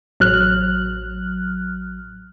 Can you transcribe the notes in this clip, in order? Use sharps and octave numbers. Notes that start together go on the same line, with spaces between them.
A1 F#3 F6 F#6